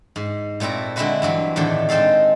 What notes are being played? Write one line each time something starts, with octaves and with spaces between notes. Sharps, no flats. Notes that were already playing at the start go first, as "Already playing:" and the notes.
G#2
A#2 A3 C4 E4 A#5
D3 G#3 C4 E4 F#4 B4
G2 E3 F#3 C4
E2 A2 D3 D#3 A3 D4
G#3 C4 D#4 A4 F5